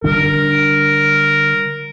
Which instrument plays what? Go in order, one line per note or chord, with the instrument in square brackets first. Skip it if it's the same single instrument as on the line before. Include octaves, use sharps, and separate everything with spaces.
[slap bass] D3 G3 D4 [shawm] A#4